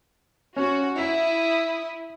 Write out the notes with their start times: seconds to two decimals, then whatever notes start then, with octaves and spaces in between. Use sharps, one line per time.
0.56 C#4 F#4
0.99 E4 E5 D#6